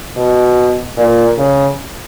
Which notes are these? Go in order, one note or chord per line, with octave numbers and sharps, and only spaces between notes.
B2
A#2
C#3